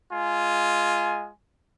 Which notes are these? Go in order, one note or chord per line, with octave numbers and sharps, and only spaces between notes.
G#3 F4 G#5